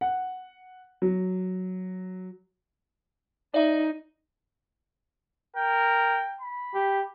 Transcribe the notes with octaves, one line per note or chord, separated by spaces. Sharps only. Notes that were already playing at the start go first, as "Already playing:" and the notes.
F#5
F#3
D#4 D5 E5
A#4 G5
B5
G4